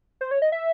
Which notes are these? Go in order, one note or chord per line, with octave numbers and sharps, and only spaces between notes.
C5
C#5
D#5
E5